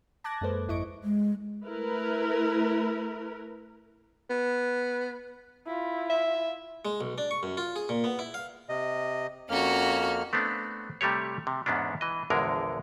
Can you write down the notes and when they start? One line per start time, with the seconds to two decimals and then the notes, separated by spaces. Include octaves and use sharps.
0.24 A5 D6 F#6 G#6 A#6
0.41 F#2 G#3 A#3 A4 B4 C5
0.68 G#1 F2 E4 D#5 C#6 D7
1.04 G#3
1.63 A3 E4 A#4 B4
4.30 B3
5.66 E4 F4
6.10 E5
6.85 G#3
7.01 B1
7.18 D4
7.31 C#6
7.43 F#2
7.57 F4
7.76 G#4
7.89 A#2
8.04 B3
8.19 E4
8.34 F5
8.69 C3 D#5
9.49 F2 A#3 C#4 F#4 F6
10.33 A3 B3 C4 D4
11.01 C3 G3 A3 G4 C#5
11.47 C3
11.66 E2 G#2 B3 C#4 D4
12.01 E3 D#5
12.30 A#1 E2 D3 G#3 A#4